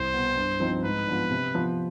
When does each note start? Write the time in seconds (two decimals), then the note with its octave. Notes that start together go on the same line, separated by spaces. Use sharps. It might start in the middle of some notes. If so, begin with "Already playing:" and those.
Already playing: C2 C5
0.14 B2 B3
0.36 G2
0.60 F3 C4 D#4
0.83 G#2 B4
1.07 F3 B3 D4
1.30 C3
1.54 F3 B3